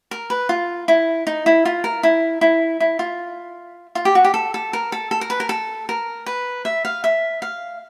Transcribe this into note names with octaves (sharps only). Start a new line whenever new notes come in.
A#4
B4
F4
E4
D#4
E4
F4
A#4
E4
E4
E4
F4
F4
G4
F#4
G4
A4
A4
A#4
A4
A4
A#4
B4
A#4
A4
A#4
B4
E5
F5
E5
F5